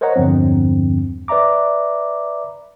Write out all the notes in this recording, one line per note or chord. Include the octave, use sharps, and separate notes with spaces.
A#4 C5 C#5 D#5 F#5 A#5
E2 G2 D3 F3 C4
B4 D5 E5 A#5 D6